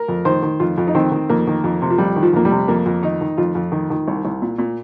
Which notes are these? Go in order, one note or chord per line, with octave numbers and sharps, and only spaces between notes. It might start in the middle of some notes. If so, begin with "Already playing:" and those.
Already playing: A#4
F2
D#3 C5
D#3
F2 F4
F2
D#4
D#3 C4
D#3
F2 A#3
D#3
F2
C3
F3
F2 G3
D#3
F3
F2 A#3
G3
C3
F2 A#3
F2
D#3 D#4
D#3
F2 F4
F2
D#3
D#3
C2
C2
A#2
A#2